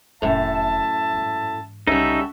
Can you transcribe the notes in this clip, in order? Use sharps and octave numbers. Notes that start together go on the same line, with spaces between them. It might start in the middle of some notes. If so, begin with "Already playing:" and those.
F1 F#2 A2 D3 E5 A5
G#2 E3
C2 C#3 G3 D#4 F#4 A4 E5